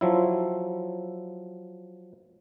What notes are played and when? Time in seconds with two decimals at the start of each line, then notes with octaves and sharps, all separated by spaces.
0.01 F3 F#3 E4